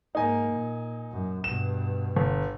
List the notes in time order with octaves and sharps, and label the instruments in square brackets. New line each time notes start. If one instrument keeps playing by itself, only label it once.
[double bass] G#2 A#3 [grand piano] D#4 G#5
[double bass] A#2
F#2
[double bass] G2 B2 [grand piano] E7
[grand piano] G1